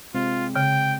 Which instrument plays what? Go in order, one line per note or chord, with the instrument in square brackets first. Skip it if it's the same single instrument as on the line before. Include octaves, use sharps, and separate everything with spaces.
[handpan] C3 G#3 C4 [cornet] F4
[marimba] C#3 [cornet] G5